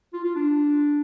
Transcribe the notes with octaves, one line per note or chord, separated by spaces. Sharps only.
F4
F4
D4